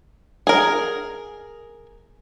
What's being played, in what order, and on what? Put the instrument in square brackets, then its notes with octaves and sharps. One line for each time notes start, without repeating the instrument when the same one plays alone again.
[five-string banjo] G#4 A#4